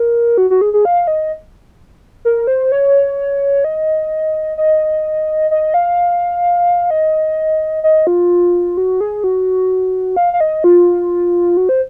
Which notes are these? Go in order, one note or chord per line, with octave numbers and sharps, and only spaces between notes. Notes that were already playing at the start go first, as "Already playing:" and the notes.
Already playing: A#4
F#4
F#4
G#4
G#4
F5
D#5
A#4
C5
C#5
D#5
D#5
D#5
F5
D#5
D#5
F4
F#4
G#4
F#4
F5
F5
D#5
F4
F#4
C5